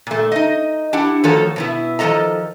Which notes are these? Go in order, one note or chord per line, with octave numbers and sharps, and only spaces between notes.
A#2 A3
D#4 D#5
D4 E4 G4 F#5
D#3 F3 A3 F#4 A4 C#5
B2 B3 E4
D#3 F3 G#3 A4 D#5 A#5